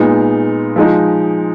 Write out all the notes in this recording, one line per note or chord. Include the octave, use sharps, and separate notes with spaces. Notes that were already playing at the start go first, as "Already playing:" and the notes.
Already playing: A#2 G#3 B3 D#4
F3 G#3 D#4